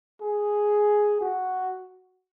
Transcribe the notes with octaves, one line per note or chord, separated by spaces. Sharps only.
G#4
F#4